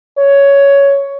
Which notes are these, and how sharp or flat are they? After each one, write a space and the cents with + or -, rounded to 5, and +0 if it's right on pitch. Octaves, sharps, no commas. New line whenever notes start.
C#5 +10